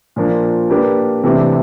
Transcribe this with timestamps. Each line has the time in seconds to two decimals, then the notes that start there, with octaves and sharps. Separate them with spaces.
0.16 A#2 F3 A#3 D4
0.70 A#3 D4 G4 B4
1.23 C3 E3 A3 D4 G4